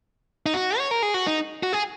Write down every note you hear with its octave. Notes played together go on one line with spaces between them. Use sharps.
D#4
F#4
C#5
A#4
G#4
F#4
D#4
F#4
G#4